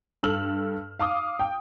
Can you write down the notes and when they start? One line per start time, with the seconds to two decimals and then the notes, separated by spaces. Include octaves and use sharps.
0.23 G2 A4 E6 F6 F#7
0.99 F5 D6 D#6
1.39 G5